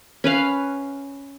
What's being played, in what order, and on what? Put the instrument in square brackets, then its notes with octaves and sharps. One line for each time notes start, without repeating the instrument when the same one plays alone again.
[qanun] C#4 B4 F5